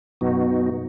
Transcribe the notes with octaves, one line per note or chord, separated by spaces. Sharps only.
F#2 B2 B3 D#4 F#4